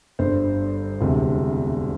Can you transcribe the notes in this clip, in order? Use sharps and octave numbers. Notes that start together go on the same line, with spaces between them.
G1 G2 D3 C5
E1 D2 C3